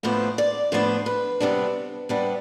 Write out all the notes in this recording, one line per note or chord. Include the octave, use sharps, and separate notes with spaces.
A2 F3 B3 D4 C5
D5
A2 F3 B3 D4 C5
B4
C3 G3 B3 D4
C3 G3 B3 D4